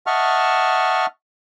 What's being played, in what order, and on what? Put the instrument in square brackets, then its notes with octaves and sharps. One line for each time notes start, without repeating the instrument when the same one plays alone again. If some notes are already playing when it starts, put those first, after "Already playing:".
[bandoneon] D#5 E5 F#5 A5 C#6 F6